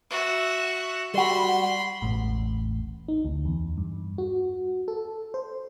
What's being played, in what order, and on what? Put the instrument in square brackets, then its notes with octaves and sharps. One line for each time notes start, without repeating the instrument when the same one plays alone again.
[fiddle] F#4 E5
[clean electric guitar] G3 F#4 [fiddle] B5 C6
[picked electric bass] E1 A1 A2
[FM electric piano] D#4
D2
E2
G2
F#4
A4
C5